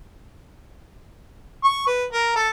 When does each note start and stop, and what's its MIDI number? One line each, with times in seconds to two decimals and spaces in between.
1.64 1.86 85
1.87 2.05 71
2.13 2.34 70
2.36 2.50 69